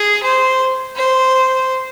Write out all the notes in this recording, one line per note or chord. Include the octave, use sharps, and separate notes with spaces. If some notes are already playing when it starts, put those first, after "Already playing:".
Already playing: G#4
C5
C5